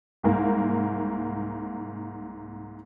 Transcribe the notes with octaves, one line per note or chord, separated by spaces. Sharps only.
C2 G#2 A#3